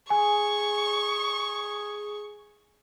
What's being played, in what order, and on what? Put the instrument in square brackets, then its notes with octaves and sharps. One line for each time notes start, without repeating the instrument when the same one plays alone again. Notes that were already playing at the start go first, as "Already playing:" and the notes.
[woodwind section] G#4 [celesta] G#5 [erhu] C#6